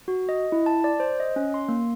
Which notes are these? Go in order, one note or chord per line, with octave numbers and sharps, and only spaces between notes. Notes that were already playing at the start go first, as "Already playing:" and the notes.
F#4
D#5
E4
A5
D5
C5
D#5
C#4
C6
A#3